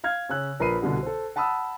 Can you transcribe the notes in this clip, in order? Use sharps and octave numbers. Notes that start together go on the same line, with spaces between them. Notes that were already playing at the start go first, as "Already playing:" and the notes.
F5 F6 G#6
C#3 C#4 E6 F#6
A#1 A#4 B4 B5 C7 D#7
C2 B2 D3
A4 C5
F#5 A5 B5 D#6 E6